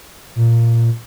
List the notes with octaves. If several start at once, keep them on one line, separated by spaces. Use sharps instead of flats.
A#2